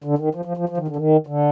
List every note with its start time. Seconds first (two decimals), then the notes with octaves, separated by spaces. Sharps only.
0.04 D3
0.18 D#3
0.35 F3
0.45 F3
0.57 F3
0.69 F3
0.78 D#3
0.88 D3
0.96 D#3
1.27 D3